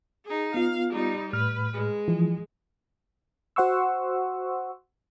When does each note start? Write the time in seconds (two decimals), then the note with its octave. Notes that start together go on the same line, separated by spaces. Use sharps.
0.25 D#4 G#4
0.54 B3 F4 F5
0.90 G3 D#4
1.33 A2 B4 F6
1.73 G#3
2.08 E3 F3
3.56 F#4 C5 F#5 C6 C#6 E6